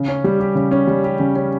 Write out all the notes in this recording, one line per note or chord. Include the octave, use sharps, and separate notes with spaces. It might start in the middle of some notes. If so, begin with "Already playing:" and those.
Already playing: C#3
C#4
G3
G4
C#3
C#4
G3
G4
C#3
C#4